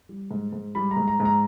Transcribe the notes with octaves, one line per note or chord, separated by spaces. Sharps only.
G3
G#2
G#2
G3 B5
A#5
G#2
A#5
G#2
A#5